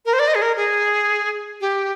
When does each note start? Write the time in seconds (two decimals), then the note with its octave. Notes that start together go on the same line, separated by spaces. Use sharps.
0.06 A#4
0.13 C5
0.19 D5
0.28 D#5
0.35 G#4
0.42 A#4
0.57 G#4
1.61 G4